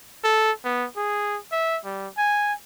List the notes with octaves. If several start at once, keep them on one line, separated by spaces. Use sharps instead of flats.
A4
B3
G#4
E5
G3
G#5